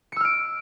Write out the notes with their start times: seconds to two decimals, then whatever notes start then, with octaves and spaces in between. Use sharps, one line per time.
0.12 C#7
0.16 E6
0.21 F6
0.25 D7